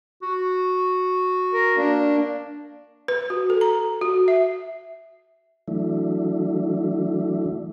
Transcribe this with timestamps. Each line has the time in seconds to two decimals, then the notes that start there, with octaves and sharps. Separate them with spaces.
0.22 F#4
1.53 A#4
1.77 A#3 D4
3.08 B4
3.30 F#4
3.50 A4
3.61 A#5
4.01 F#4
4.28 E5
5.68 E3 F#3 A3 D4 E4